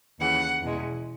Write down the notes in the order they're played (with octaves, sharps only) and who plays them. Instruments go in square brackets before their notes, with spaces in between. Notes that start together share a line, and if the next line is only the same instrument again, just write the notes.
[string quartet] D#2 C#3 E3 F#5
E2 B2 G#3